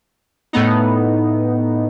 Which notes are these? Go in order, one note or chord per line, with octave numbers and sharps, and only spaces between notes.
A2 A3 B3 D#4